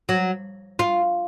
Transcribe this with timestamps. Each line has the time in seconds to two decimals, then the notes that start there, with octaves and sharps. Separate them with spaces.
0.09 F#3
0.79 F4